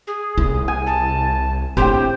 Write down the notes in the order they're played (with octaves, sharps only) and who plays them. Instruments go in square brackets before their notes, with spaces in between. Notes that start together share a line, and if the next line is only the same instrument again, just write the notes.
[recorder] G#4
[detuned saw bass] C2 [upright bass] E4
[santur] G#5
[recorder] A5
[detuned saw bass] A2 [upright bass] C4 D4 [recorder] G4 [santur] C5 G5